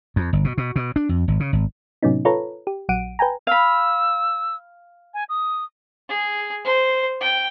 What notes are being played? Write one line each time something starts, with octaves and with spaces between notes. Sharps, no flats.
F2
G1
B2
B2
B2
D4
F2
G#1
C#3
G#1
A2 C3 F#3 B3 C#4 D#4
F4 A4 B4 C#5 A#5
G4
A#1 F#3 F#5 D7 D#7
B4 G5 G#5 A#5
F5 B5 E6
G#5
D#6
G#4
C5
G5